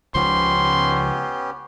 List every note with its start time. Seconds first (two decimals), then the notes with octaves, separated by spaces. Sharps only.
0.15 C#2 C#3 F3 B3 C#4 G4 C6